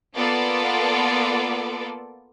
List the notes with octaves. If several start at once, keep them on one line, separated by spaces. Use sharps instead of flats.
A#3 B3 F4 A4 D5